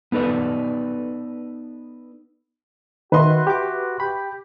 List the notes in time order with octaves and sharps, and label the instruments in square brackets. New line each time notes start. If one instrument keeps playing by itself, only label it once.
[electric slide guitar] B3 D#4 A4 B4 D5
[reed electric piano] D#3 D#5 [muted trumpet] F#4 [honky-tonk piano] B4 E5 C6
[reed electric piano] G4 D6
[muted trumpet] G4 [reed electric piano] B5